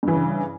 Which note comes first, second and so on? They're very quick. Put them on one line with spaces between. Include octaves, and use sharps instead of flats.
G2 E3 C#3